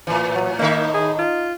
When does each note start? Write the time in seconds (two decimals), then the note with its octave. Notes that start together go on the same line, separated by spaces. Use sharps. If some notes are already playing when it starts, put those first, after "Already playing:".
0.07 A2 E3
0.35 F#3
0.59 A2 D#3 A#3 D#4 E5
0.94 G#4
1.19 F4